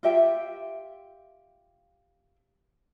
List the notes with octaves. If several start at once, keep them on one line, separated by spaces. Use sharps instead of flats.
F4 G4 E5 G5